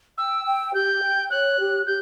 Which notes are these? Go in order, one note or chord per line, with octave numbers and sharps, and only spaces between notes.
G5 E6
G5
G4 G6
G5
C#5 F#6
G4
G4 G6